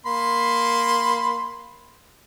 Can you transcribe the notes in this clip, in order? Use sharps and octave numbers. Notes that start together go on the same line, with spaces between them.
A#3 B5 C6